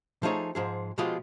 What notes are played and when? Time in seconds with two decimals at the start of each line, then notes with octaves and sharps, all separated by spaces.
0.23 F3 A3 D#4 G#4 C#5
0.55 G#2 F3 G#4
0.98 B2 F3 G#3 F4 G4